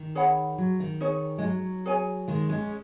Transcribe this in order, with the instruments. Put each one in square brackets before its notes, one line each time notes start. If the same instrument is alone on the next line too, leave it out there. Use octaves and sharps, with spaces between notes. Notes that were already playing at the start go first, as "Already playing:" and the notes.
Already playing: [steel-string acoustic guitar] D#3
[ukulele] G#4 C#5 F#5 B5
[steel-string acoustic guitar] F#3
D#3
[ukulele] D#4 G#4 C#5
[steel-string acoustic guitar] G#3
F#3
[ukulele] G#4 C#5 G#5
[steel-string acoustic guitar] D#3 G#3
G#3 C#4